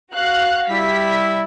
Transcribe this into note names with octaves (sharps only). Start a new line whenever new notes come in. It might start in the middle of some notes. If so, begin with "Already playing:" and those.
F#4 F5 F#6
G3 E4 B6